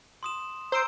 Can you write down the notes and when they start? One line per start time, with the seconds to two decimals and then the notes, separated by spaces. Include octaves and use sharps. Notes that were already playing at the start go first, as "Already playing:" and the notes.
0.23 C6 D#6 E7
0.72 C5 A#5 E6 D7